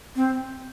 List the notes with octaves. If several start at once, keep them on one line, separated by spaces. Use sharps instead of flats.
C4